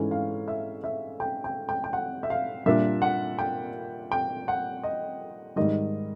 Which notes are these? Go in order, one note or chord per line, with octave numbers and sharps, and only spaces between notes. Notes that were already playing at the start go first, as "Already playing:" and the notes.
Already playing: G#2 E3 A3 C#4
F5
E5
E5
G5
G5
G5
G5
F#5
E5
F5
A#2 G3 A#3 D4 E5
F#5
G5
G5
F#5
D#5
G#2 D#3 G3 D#5